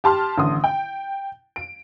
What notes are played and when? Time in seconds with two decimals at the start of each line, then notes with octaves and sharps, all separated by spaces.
0.04 G4 A5 C6 F6
0.38 A1 D3 C6 D#6
0.64 G5
1.56 D7